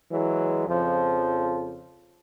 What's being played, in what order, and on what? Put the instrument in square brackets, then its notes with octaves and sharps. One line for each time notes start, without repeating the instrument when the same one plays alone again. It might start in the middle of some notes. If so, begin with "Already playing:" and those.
[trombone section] E3 F#3 G#3
F2 C#3 F3